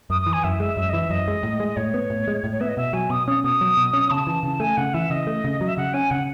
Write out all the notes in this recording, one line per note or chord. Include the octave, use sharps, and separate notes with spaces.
F#2 D#6
E3 D#6
G#5
F#2 E5
G#3 E5
F#2 E5
D#5
E3 E5
F#2 D#5
G#3
A2
G#3
D#5
A2 C#5
B3
A2
G#3
A2
C#5
B3 E5
D#5
B2 E5
F#3 G#5
B2 D#6
C#4 D#6
B2 D#6
F#3
B2
C#4
C#3 A5
E3 A5
C#3 A5
A3 G#5
C#3 F#5
E3 E5
C#3 D#5
A3
C#3
F#3
E5
C#3 F#5
C#4 G#5
C#3 F#5